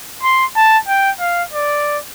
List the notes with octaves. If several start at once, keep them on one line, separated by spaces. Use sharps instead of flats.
C6
A5
G5
F5
D5